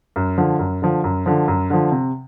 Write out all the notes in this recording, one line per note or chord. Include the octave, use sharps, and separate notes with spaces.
F#2
D3 F3
F#2
D3 F3
F#2
D3 F3
F#2
D3 F3
C3